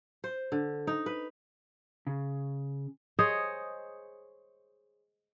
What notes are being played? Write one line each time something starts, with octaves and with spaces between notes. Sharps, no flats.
C5
D3
D#4
B4
C#3
G#4 C5 C#5 D#5